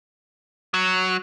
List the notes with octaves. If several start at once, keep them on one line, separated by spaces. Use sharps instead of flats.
F#3